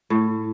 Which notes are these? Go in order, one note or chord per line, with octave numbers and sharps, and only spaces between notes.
A2